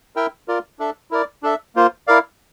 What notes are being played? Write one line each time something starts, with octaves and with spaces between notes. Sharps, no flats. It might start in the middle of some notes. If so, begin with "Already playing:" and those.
E4 A#4 E5 G5
F4 A#4 D5
D4 A4 E5
E4 A#4 D5
D4 A4 E5
A#3 F4 C5
E4 A#4 D5 F5